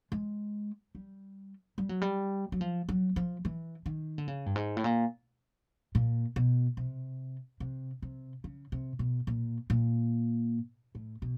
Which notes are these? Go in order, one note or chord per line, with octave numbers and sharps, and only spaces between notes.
G#3
G3
G3
F#3
G3
F#3
F3
F#3
F3
E3
D#3
D3
C#3
G2
G#2
A2
A#2
A#2
B2
C3
C3
C3
C#3
C3
B2
A#2
A#2
A2
B2